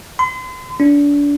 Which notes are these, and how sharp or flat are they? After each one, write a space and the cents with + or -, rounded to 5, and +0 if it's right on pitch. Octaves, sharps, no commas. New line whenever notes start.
C6 -40
D4 -30